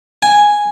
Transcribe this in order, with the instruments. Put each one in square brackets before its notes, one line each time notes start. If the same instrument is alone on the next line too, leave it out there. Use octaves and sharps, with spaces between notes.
[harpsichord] G#5